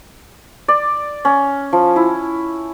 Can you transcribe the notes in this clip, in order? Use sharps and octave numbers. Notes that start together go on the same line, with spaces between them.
D5
C#4
F3
E4